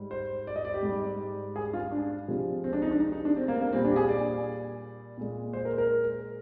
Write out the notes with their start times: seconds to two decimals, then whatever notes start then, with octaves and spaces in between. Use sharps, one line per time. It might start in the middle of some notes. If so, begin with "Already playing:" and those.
Already playing: G#2 G3
0.11 C5
0.47 D5
0.56 D#5
0.65 D5
0.74 G4
0.83 G#2 G3
1.56 G#4
1.73 F4
1.91 D4
2.28 C3 F3 G#3
2.64 C4
2.73 D4
2.82 D#4
2.91 D4
3.00 D#4
3.12 D#4
3.25 D4
3.37 C4
3.48 A#3
3.61 A#3
3.73 A#2 G3 C4
3.84 D4
3.91 G4
3.96 G#4
4.09 D5
5.17 A#2 G#3
5.53 C5
5.65 A#4
5.78 A#4